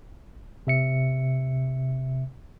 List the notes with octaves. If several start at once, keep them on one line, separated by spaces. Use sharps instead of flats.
C3 E5 C#7